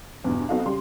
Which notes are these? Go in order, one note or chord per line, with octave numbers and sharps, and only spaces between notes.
E2 G2 B2
B3 C4 D#4 F#4 A4 F5
C#3 G3 C6